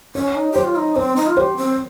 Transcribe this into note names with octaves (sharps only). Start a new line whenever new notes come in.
C#4 C#5
D#4
G4 C5
F4
D#4
C4 C5
D#4
F4
G4 C5
C4